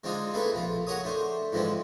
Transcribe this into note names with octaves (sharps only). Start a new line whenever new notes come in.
G#3 C4 D4 D#4 F4 G#4
A3 A#3 C4 G#4 A4 B4
A#1 F4
F#4 G#4 A#4 C#5 D#6
A3 D4 C5
G#2 E3 F3 G#3 C4 D4